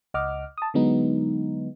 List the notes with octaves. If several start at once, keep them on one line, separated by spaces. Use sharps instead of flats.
C#2 D#5 F#5 D6 F6
A5 D#6
D3 F#3 G#3 B3 D#4